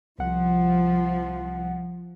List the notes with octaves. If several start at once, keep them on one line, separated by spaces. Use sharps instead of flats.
C2 F3 F#5